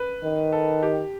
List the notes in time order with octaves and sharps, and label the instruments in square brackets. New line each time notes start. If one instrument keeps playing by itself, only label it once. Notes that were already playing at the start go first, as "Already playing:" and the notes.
Already playing: [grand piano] B4
[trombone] D#3
[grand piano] A4
G4